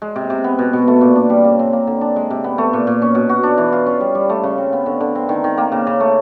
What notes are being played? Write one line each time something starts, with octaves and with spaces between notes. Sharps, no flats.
G#3
C3
C3
B3
B2
B2
A3
A#2
D4
G3
C#3
C4
A#3
D3
D4
G#3
C3
B3
A3
A#2
A#2
C#4
B2
F#4
D4
E3
F4
C#4
G3
G3
A3
C#3
C4
B3
D3
D3
C4
D#3
D#3
A#3
C#3
C#3
A3